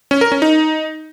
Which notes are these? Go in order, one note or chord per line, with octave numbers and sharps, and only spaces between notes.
C#4
A#4
C#4
D#4